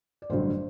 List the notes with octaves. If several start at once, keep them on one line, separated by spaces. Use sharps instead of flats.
D5
A1 G2 D3 F#3 C5